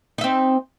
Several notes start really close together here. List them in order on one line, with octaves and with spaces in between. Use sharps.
D#4 E5 C4